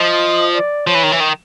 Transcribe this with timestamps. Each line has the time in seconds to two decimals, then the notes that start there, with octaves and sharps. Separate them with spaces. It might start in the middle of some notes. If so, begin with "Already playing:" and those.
Already playing: F3 D#5
0.55 D5
0.87 F3 C#5
0.95 E3
1.03 D#3
1.12 E3
1.20 D#3